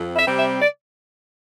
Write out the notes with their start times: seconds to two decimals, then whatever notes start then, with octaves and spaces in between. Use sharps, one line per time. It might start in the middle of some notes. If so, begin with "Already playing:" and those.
Already playing: F2
0.16 E5
0.27 C3 G3 C4
0.39 E5
0.62 D5